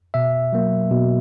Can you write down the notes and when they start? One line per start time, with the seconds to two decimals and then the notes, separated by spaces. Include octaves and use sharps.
0.14 B2 E5
0.53 F#3 A#3
0.91 B2